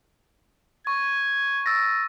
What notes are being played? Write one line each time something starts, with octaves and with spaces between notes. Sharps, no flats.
C#6 G#6
E6 A6 A#6